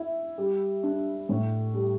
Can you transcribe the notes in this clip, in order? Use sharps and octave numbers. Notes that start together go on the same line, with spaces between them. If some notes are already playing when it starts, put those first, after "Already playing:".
Already playing: E4
G3
D4
A2
G3